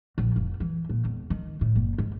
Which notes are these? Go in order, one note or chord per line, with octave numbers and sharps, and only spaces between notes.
A#1
F1
E3
A#2
E1
D#3
A2
F#1
G#2